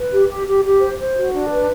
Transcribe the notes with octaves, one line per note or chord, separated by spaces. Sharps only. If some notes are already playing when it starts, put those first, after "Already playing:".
Already playing: B4
G4
G4
G4
G4
C5
C5
F#4
D4
B4